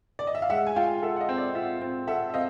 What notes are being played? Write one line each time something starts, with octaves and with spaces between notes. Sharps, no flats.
D5
D#5
E5
F5
G#3 E5 F#5
G#5
F4 F5 G5
A4 E5 F#5
F#5
D#5 F5
C4
D5 E5
F4 E5 F#5
C4
A4 E5 F#5
E5
C4 D#5 F5